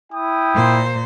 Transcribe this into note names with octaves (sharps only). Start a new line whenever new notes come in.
E4 G5 D#6
A#2 C5